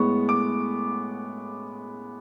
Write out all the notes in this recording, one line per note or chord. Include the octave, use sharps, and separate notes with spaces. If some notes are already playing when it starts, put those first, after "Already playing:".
Already playing: A2 G#3 B3 C#6
D6